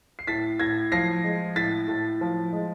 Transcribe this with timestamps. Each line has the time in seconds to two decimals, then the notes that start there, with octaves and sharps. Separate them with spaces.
0.19 C7
0.27 A2 A6 B6
0.59 A2 G#6 A#6
0.92 F3 A#6 C7
1.24 G#3
1.56 A2 A6 B6
1.88 A2
2.21 F3
2.53 G#3